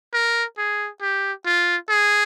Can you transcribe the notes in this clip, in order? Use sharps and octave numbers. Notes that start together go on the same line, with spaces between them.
A#4
G#4
G4
F4
G#4